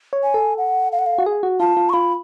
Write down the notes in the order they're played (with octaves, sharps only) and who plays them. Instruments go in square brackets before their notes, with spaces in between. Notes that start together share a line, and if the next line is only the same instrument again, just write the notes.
[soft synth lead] C#5
[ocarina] G#5
[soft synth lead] A4
[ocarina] F#5
F5
F#5
F5
[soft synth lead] F#4
G#4
F#4
[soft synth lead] F4 [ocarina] A5
[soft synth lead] F4
[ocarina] C#6
[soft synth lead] F4 [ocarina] B5